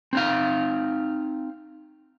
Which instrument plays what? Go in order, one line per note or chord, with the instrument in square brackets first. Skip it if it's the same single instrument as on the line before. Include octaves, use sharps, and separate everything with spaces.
[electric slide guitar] C4 D#4 F5